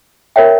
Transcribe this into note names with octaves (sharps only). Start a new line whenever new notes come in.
A#4 C#5 E5 G5